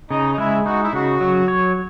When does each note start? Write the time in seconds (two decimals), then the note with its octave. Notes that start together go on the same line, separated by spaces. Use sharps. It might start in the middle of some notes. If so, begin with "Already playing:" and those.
0.11 C#3 D#4
0.32 D#4
0.38 G#3 E4
0.65 D#4 F#4
0.83 E4
0.93 C#3 F#4
1.21 F#3
1.48 C#5